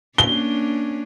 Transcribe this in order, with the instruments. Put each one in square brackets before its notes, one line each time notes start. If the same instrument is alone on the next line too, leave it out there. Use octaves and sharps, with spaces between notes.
[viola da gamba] A#3 C#4 D4 [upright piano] G7